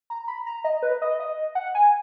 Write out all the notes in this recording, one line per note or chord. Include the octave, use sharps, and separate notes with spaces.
A#5
B5
A#5
D#5
B4
D#5
D#5
F#5
G#5